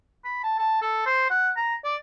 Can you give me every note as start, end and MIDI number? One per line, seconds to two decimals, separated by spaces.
0.25 0.43 83
0.43 0.58 81
0.59 0.77 81
0.82 1.04 69
1.06 1.26 72
1.30 1.51 78
1.56 1.75 82
1.84 1.96 74